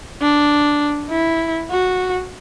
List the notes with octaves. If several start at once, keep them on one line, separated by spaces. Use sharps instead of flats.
D4
E4
F#4